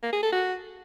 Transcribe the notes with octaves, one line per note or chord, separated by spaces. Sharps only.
A#3
G#4
A4
F#4